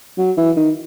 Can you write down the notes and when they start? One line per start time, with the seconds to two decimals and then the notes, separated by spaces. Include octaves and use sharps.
0.18 F#3
0.37 E3
0.56 D#3